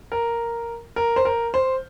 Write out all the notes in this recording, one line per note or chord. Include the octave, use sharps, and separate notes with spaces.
A#4
A#4
C5
A#4
C5